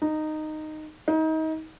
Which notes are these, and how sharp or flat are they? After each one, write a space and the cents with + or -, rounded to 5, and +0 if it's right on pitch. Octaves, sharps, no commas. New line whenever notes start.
D#4 -10
D#4 +30